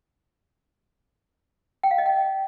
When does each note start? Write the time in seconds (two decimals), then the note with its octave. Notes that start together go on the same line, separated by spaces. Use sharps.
1.83 G5
1.91 F5
1.98 D#5
2.06 G5